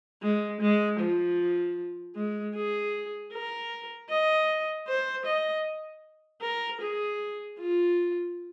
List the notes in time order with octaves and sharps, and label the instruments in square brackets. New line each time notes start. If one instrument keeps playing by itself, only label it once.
[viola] G#3
G#3
F3
G#3
G#4
A#4
D#5
C5
D#5
A#4
G#4
F4